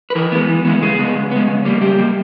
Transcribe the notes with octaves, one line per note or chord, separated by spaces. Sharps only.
B4
E3 A#4
G#3 B3
E3
G#3 B3
C#3 G#4
G#3 B3
C#3
G#3 B3
C#3
G3 A#3
C#3 G4
G3 A#3